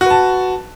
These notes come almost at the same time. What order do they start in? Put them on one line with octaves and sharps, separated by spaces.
F#4 B4 A5